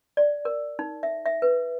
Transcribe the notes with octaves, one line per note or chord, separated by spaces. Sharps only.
D5
A#4
D#4
E5
E5
B4